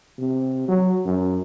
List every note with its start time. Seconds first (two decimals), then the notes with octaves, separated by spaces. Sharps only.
0.18 C3
0.68 F#3
1.05 F#2